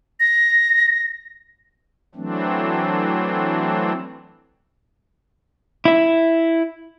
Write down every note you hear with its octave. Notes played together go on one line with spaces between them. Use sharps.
A#6
E3 F#3 A3 C4 D4
E4 E5